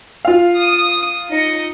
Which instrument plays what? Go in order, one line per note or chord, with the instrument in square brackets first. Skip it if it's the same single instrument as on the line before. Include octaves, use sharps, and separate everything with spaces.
[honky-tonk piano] F4 F5
[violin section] D#6
D#4 D#5 C#7